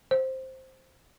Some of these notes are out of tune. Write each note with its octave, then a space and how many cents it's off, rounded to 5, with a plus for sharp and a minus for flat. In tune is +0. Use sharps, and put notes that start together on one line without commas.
C5 +5